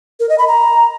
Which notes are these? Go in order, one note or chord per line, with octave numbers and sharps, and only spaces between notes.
A#4
D#5
B5
A#5